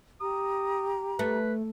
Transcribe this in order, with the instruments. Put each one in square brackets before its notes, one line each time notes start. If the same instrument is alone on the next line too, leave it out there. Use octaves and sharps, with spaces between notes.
[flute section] G4 A#5 [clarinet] D#6
[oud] A3 [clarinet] B4